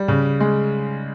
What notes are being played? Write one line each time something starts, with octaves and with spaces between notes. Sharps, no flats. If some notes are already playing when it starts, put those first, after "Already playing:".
Already playing: G3
C#3
G#3